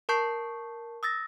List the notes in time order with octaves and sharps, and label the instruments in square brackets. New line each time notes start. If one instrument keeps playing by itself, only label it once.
[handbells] A#4 A5 C#6 G6 C7
D#6 E6 A6 A#6